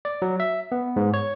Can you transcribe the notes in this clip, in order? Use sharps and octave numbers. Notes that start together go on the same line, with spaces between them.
D5
F#3
E5
B3
G#2
C#5